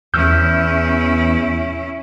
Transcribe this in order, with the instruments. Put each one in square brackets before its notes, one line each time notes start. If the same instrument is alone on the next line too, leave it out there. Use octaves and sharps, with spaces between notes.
[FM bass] E2 [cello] C#4 E4 [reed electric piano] E6 F6 G6